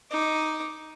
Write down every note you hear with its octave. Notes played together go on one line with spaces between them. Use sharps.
D#4 D6